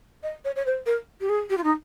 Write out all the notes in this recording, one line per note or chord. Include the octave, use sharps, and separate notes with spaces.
D#5
C#5
C#5
C5
A#4
G4
G#4
G4
F4
D#4